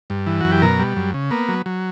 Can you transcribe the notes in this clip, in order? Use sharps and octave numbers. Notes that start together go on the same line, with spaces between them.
G2
E3
F#2 F#4
G4
B2 A#4
G3
F#2
C#3
A#3 B3
F#3
F#3